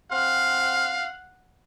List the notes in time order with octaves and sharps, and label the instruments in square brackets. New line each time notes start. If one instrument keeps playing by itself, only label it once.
[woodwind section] C4 C6 F6 [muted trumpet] F5 [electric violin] F#5